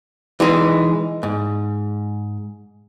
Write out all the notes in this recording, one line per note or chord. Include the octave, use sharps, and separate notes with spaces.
E3 G#3 D#4
G#2